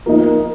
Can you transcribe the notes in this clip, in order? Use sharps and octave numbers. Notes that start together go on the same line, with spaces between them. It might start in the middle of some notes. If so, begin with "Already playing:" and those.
F3 A#3 D#4 A#4